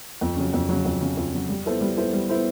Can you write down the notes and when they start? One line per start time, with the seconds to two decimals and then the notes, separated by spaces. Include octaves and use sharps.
0.21 F2
0.37 C#3 F#3
0.53 F2
0.69 C#3 F#3
0.85 F2
1.01 C#3 F#3
1.17 F2
1.33 C#3 F#3
1.49 G3
1.65 B3 E4 A4 C5
1.81 G3
1.97 B3 E4 A4 C5
2.13 G3
2.29 B3 E4 A4 C5